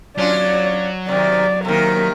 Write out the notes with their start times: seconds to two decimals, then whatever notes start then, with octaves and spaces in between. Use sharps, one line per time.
0.18 F#3 C#4 D4 F4 D5
1.09 C3 D#3 D5
1.65 C3 D#3 A#3 A#4